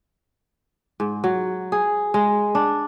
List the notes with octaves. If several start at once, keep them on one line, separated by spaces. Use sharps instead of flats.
G#2
F#3
G#4
G#3
D4